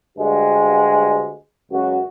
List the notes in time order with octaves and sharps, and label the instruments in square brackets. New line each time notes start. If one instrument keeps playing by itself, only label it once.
[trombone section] D2 G2 G#3 F#4
C#2 F#2 F#4